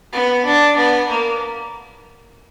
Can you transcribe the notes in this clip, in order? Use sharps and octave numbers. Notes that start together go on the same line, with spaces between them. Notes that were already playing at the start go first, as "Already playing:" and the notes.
B3
D4
B3
A#3